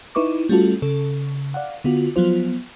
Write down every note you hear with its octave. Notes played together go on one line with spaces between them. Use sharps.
D#4 E4 B4 C#6 D6
G3 A3 C#4 F4 F#4 A4
C#3 A4
D5 F5 F#5
D3 B3 F4 F#4
F3 F#3 B3 F4 C5